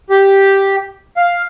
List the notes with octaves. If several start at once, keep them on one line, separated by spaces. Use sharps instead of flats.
G4
F5